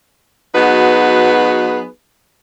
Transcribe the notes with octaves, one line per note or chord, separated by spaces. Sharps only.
F#3 B3 D#4 F#4 G#4 B4